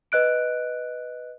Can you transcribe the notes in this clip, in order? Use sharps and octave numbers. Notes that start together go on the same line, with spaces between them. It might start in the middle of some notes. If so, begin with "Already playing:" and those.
B4 D#5 F#6 D7